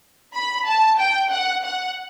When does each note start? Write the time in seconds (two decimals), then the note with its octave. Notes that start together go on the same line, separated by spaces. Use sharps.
0.35 B5
0.66 A5
0.98 G5
1.31 F#5
1.63 F#5